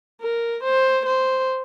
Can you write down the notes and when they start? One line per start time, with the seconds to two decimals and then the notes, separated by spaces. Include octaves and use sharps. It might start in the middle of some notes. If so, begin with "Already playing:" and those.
0.21 A#4
0.64 C5
1.06 C5